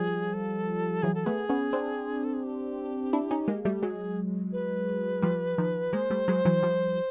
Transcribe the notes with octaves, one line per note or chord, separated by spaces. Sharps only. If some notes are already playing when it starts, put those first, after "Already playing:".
Already playing: F3 G3 G#4
A4
E3 F#3 G#4
A4
A3 B3 G#4
B3 C#4
C4 D4
A4
G#4
G4
D4 E4
C#4 D#4
G#3 A#3
G3 A3 F#4
G4
F#3 G#3 G#4
B4
F3 G3
D#3 F3
G#3 A#3 C5
G3 A3
F#3 G#3
E3 F#3
F3 G3